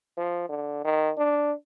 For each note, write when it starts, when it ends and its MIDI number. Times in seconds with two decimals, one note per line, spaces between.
0.17 0.46 53
0.49 0.80 50
0.85 1.12 51
1.18 1.53 62